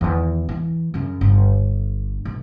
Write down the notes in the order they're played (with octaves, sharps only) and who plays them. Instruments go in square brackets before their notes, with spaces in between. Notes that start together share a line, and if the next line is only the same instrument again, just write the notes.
[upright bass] E2 D#3
E3
F#2 C#3
G1
B1